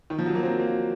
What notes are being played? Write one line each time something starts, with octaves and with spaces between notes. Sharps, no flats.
D#3
F3
F#3
A#3
C4
A#3